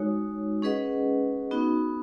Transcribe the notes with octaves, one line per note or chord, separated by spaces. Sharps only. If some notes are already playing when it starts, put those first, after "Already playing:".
Already playing: G#3 D#4 F#4 C#5
C#4 G#4 B4 D#5 F#5
B3 D#4 F#4